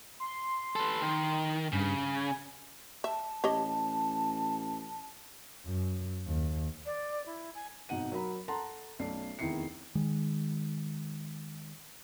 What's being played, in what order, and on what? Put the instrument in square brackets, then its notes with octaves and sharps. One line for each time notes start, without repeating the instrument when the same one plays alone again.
[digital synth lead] C6
[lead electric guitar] A4 B4
D#3
[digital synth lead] G2 [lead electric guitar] C#3
[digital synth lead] G#5
[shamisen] E5 [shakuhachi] A5
[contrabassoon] A1 [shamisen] G4 C#5 D#5
[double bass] F#2
D#2
[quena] D5
E4
G#5
[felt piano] G#1 B2 D#4 F#5 D#7
F#3 A#4 A#5 B5
A4 F#5 A5 A#5 C6
B1 A3 C#4 D5 C7
F1 E2 D#3 E4 C7 C#7
[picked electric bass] D#3 G#3